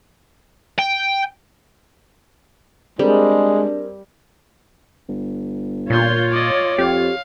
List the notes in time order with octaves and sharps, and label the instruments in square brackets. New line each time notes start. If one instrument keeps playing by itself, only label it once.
[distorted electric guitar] G5
[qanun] G3 [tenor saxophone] G#3 [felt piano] C4 G#4 A#4 [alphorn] D4
[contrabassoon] G1
[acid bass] A#2 [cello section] F4 C#5 [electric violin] C6 G6
[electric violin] D5 D#5
[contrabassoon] F2 [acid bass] G4 [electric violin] F5